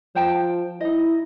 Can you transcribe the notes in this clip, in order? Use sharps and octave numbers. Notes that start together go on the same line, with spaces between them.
F3 C5 G5 A5
D#4 E4 D#5